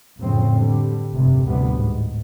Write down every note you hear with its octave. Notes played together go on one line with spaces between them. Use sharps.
F2 A2 C#3 F3 C4
D3 G3
F1 G2 C3 G3
A1 D2 C3 G3 B3
G#2